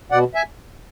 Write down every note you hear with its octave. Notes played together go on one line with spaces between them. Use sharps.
B2 D5 F#5
E5 G#5